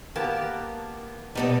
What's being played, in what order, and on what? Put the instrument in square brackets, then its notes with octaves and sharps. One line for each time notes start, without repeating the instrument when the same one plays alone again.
[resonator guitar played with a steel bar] A#3 B3 G4 [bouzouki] A5
[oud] B2 B3 D#4 [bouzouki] G3 A4 D5